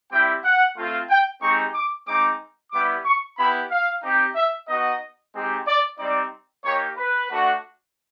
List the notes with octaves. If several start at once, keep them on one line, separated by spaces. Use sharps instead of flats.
G3 C4 E4 G4 G5
F#5
A3 C4 F4
G5
G#3 C4 D#4 G4 C#6
D6
G#3 C4 D#4 D6
G3 B3 E4 G4 D6
C#6
B3 E4 G4 B5
F5
C4 D#4 G4
E5
B3 D#4 F#4 D#5
G#3 C4 D#4 G4
D5
G3 C4 D#4 D5
A#3 D#4 G4 C#5
B4
A3 D4 F#4